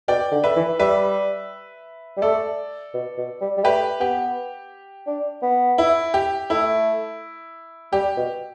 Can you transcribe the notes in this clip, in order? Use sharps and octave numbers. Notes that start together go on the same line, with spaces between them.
B2 D5 G5
D3
B4 E5
E3
G3 B4 E5
G3
A3 A4 D5
B2
B2
G3
G3
A3 G4 B4
B3 G4
D4
B3
E4
G4
A3 E4
G3 G4
B2